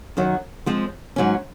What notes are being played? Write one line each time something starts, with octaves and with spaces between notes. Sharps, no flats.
F#2 D#3 F#3
F3 G#3 C4
G#2 F#3 C#4